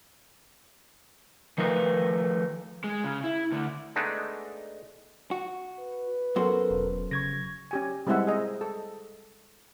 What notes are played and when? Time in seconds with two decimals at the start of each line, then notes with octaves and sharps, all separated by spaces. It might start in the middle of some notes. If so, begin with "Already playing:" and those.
1.58 D#3 F3 A3 A#4 B4
2.84 G#3
3.04 C#3
3.24 E4
3.52 D2 D3
3.96 G#3 A3 B3 D4 D#4
5.31 F#4
5.80 B4
6.36 F#2 B3 F#4 A4 A#4 C5
6.71 E1
7.11 C#3 C#6 G#6 A#6
7.71 C#4 G4 G#5
8.07 G3 G#3 C4 E4 E5 F#5
8.27 G#4 C5 D#5
8.61 A4